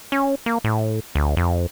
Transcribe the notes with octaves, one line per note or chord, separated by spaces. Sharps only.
C#4
A#3
A2
D2
F2